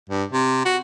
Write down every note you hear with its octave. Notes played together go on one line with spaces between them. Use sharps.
G2
C3
F#4